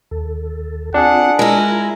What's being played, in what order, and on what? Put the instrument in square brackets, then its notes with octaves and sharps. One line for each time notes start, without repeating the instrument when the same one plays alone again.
[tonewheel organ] D#2 A4
[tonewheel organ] C4 F4 [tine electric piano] D4 G#4 [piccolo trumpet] F#5
[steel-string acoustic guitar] G#3 E4 [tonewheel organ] F4 [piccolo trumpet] A#4